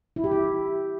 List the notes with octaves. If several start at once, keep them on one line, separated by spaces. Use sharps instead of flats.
E4
G4
E4